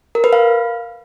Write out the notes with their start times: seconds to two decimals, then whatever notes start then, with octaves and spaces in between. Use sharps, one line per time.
0.15 A#4
0.24 B4
0.33 F5